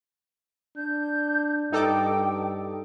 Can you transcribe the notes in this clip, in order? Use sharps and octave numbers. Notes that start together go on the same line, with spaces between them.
D4 G6
G2 D#4 A4 G5 D6